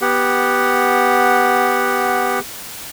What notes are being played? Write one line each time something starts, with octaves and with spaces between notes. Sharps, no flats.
B3 G4 F#5